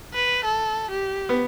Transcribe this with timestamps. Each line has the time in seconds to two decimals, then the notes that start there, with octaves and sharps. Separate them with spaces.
0.14 B4
0.44 A4
0.91 G4
1.29 B3